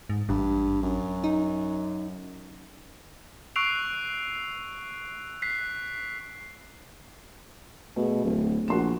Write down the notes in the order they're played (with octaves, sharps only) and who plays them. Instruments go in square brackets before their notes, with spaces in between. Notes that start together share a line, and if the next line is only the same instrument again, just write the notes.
[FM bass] G#2
[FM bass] A1 [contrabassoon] G2
[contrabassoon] F#2
[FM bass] D#4
[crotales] C#6 E6 F#6 C7 D7 F7
F#6 B6 C7
[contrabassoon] B2 [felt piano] A3 G#4
[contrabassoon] D1
[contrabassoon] A#1 [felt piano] F#4 C6 E7